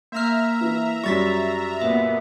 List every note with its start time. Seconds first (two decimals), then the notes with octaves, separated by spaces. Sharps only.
0.12 A#3 E5 A#5 F6
0.61 E3
1.04 F#2 G3 C#6 A6 B6
1.82 A#2 B3 E5